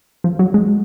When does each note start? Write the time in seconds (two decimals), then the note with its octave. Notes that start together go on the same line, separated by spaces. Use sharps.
0.24 F3
0.39 F#3
0.54 G#3